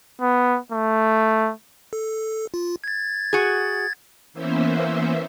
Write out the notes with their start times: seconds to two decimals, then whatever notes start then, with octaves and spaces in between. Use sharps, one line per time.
0.21 B3
0.72 A3
1.93 A4
2.54 F4
2.84 G#6 A6
3.33 F#4 G#4
4.33 E3 A#3 B3 C#4 C5 E5